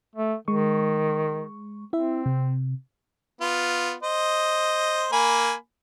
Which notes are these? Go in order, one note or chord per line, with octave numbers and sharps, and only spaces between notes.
A3
D#3 G#3 C#6
C4 E4 E5
C3
B3 F4
C5 D#5
A#3 G#5 B5